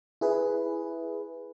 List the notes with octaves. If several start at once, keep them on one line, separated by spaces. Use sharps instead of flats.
E4 G#4 B4